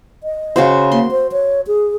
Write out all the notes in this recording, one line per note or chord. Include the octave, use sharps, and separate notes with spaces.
D#5
C#3 F#4 C5
A#3 C6
C5
C#5
G#4